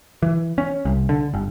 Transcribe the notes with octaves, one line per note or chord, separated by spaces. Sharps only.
E3
C#4
C2
D3
G1